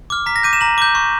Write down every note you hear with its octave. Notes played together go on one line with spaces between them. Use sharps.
D6 F6
A#5 B6
A#6
D6 G6 D#7
E7
A#5 F#7
D6 G6
C#6